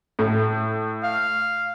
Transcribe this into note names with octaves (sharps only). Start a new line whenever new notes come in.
A2
F5